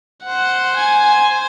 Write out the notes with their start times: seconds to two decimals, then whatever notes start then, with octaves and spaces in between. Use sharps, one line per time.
0.24 C5 F#5
0.76 G#5
1.29 C5